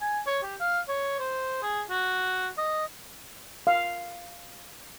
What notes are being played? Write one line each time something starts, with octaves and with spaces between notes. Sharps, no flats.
G#5
C#5
G4
F5
C#5
C5
G#4
F#4
D#5
F5